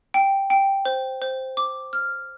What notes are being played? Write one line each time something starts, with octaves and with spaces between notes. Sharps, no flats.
G5
G5
C5
C5
D6
F6